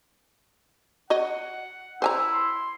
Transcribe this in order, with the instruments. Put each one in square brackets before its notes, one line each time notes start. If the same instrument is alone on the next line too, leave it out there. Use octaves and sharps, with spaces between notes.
[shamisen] F#4 C#5 D#5 [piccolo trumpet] F#5
[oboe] E4 [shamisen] C5 G#5 A#5
[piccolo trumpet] C6